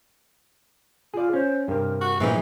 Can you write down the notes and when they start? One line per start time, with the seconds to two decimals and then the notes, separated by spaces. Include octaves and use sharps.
1.14 F4 G#4 D5
1.33 C#4 C5
1.68 G2 C3 A#4
2.01 F#4
2.20 A#2 E3 F3 D#4 G#4